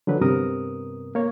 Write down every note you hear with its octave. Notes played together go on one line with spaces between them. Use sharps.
D3 F3 F#3 B4
G2 C3 B3 A#4 D#6
A#3 C#5